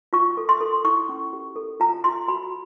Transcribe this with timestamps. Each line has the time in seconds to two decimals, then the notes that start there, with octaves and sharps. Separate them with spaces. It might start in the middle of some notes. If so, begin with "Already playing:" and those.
0.13 F4 C#6
0.37 A4
0.49 C6
0.61 A4
0.85 E4 C#6
1.09 C#4
1.33 G4
1.56 A4
1.80 F4 A#5
2.04 F4 C6
2.28 F#4 B5